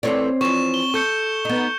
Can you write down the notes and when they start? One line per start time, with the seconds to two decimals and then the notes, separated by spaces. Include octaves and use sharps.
0.03 E3 A3 C4 A4 C#5 D5
0.41 E3 F3 C#6 E7
0.74 G7
0.94 A4 C#6 G6 C#7
1.45 B3 D#4